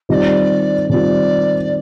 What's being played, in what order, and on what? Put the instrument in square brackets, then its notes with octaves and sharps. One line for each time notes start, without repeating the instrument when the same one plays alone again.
[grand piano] D#3 G3 C4 F4 [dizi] D5 D#5
[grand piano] D#3 G3 C4 F4 [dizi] D5